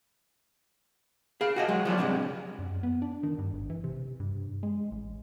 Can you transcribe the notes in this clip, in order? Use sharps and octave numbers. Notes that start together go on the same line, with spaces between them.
G#4 F5
F#4 G#4 D#5
F#3 G#3
F3 F#3 F4 D5
C#2 G2 C3 G#3
F#2
B3
D4
D#3
G2
G#1
E3
C3
G2
G#3
A1